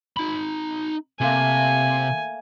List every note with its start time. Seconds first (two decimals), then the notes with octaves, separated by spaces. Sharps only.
0.17 D#4 B5
1.21 C3 A3 A#3 G#5